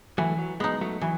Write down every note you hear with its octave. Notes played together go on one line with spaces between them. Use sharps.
E3 F#3 A3
F#3
G#3 B3 D#4
F#3 A3
E3 F#3